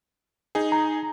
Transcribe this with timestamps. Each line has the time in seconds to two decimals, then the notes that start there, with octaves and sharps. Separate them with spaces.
0.55 D#4 G#4
0.72 A#5